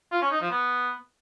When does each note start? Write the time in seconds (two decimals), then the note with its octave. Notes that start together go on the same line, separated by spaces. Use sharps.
0.12 F4
0.21 C#4
0.31 D#4
0.41 F3
0.51 B3